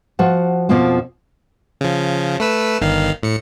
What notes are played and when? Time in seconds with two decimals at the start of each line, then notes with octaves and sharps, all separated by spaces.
0.19 F3 F#4 F#5
0.69 F2 B2 F3 A#3 F4 F#4
1.81 C#3 F3
2.40 A3 B4 E6
2.81 G1 D#3 F5
3.23 A2 C#7